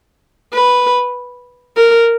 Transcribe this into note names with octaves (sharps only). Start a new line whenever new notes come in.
B4
A#4